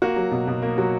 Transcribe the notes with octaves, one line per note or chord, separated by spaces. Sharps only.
A#3 F#4
F#3
B2
B2
A#3
F#3